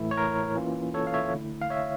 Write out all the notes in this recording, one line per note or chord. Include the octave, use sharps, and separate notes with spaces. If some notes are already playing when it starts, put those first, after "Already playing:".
Already playing: A2 E3 A3 E4
C#5
A#4
E3 A#3 C#4 F4
A4 C#5
F5
C#5 E5
D3 A3 E4
F5
C#5 E5